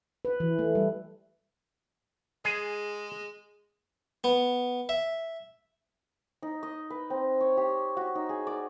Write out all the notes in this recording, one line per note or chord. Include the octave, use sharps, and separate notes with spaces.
B4
E3
A3
G3
G#3 G#4
B3
E5
D#4
D#5
B4
C4
C#5
G4
F#4
D#4
G#4
D5